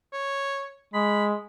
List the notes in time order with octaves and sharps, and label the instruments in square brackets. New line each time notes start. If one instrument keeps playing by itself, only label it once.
[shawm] C#5
[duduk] G#3 [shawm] B5